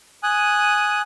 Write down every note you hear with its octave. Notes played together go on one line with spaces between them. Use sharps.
G#5 D#6 F#6